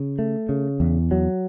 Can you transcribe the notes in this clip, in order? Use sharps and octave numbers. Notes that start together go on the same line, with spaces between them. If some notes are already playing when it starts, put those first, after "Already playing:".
Already playing: C#3
A3
C#3
E2
F#3